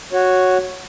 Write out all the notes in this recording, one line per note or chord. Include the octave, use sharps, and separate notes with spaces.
F#4 C#5